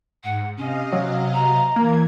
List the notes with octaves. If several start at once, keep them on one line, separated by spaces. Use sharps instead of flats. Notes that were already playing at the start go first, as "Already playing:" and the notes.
G#2 F#5
C3 C#4 D#5 F5
F#3
A#5
E3 A#3 G#6